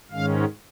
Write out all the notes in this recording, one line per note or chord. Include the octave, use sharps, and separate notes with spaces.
G#2 D#3 G#3 C#4 F5